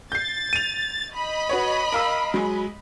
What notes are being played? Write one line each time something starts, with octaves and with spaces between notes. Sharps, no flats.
G6 A6 C7
D#7 F7
D#5 B5
F#4 B4 C#5
A#4 F5 E6
F#3 G#3